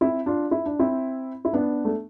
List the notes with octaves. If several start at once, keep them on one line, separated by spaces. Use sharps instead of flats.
C4 E4
D4 F4
E4
D4
C4 E4
E4
B3 D4
A3